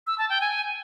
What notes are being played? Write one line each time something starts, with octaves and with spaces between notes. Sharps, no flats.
E6
A5
G5
G#5